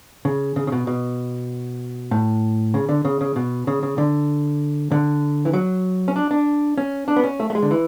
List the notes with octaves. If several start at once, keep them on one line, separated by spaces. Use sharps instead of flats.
C#3
C#3
C#3
B2
B2
A2
C#3
D3
C#3
C#3
B2
C#3
C#3
D3
D3
E3
F#3
C#4
D4
D4
C#4
D4
B3
C#4
A3
A3
G#3
D3
E3